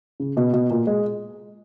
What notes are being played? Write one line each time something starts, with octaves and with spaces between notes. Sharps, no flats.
C#3
B2
B2
A#2
G#3